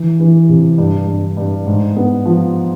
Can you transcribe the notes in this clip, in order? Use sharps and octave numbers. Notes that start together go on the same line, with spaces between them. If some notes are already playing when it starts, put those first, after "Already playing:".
Already playing: E3
E3
C3
G2
G2
G2
G#2
B3
F3